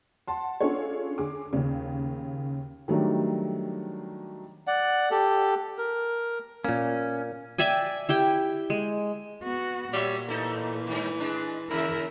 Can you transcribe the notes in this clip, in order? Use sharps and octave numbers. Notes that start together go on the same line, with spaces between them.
F#5 A5 C6
C#4 D4 F4 G#4 A4 C#5
D3 G#4 D6
D#2 C#3
D#3 F#3 G3 A3 D4
D5 F#5
G4 A4
A#4
A#2 A#3 C#4
D5 E5 G5 G#5
E4 G4 G5
G#3
B3 F#4
A#2 G3 C#5 E5
E3 A3 D#4 A4
G2 D#3
G#3 D4
D#2 C#3 E4 A#4 E5